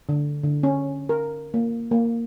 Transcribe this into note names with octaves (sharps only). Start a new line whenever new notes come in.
D3
D3
C#4
A#4
A#3
A#3